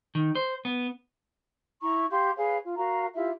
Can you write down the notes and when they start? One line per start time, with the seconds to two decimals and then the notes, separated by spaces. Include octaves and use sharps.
0.15 D#3
0.35 C5
0.65 B3
1.82 E4 A#5 C#6
2.11 G4 F5 C6 G6
2.37 G#4 B4 C#5 F5
2.64 F4
2.77 F#4 A#4 F5 A#5
3.15 E4 F4 G4 E5